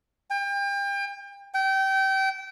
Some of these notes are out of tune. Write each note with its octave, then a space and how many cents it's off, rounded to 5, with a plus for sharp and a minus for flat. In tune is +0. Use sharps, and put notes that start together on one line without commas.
G5 +35
G5 -25